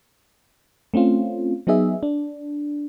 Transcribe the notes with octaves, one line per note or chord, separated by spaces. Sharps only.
A3 C4 C#4 F4
F#3 B3 D#4 G#4 E5
D4